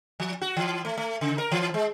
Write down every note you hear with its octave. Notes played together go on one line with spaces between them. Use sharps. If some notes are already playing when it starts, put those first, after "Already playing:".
F3
F#4
E3
A3
A3
C#3
A#4
E3
G#3